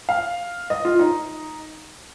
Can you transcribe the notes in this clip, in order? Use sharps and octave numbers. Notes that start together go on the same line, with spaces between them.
F5
D#5
F4
D#4